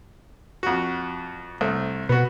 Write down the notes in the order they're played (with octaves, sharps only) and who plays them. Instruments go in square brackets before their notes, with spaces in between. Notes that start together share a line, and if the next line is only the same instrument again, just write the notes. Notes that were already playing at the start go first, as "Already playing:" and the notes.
[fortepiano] F2 F#4
C2 A3
[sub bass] B2 [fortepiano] B3 F#4